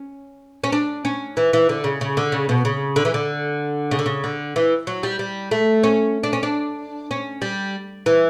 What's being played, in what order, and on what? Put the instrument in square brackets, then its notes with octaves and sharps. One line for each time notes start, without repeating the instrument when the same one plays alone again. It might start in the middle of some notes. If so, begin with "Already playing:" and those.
Already playing: [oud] C#4
C#4
D4
C#4
E3
E3
D3
C#3
C#3
D3
C#3
B2
C#3
D3
E3
D3
C#3
D3
C#3
D3
E3
F#3
G3
G3
A3
C#4
D4
C#4
D4
C#4
G3
E3